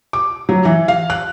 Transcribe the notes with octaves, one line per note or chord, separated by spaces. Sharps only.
D6
F#3
E3
F5
F#6